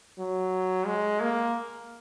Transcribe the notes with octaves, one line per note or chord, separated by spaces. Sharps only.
F#3
G#3
A#3